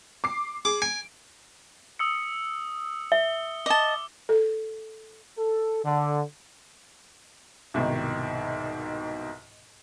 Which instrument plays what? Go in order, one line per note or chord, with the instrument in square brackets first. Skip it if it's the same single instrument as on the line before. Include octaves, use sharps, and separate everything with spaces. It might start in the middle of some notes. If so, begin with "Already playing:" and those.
[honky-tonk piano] D6 C7
[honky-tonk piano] G#4 [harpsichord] D6
[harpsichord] G#5 [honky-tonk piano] D7
[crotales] D#6 E6 C#7
[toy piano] E5 [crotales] G7
[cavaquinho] D#5 A5 [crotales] D6 G7
[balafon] A4
[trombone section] A4
D3
[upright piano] C2 G#2 B2 D#3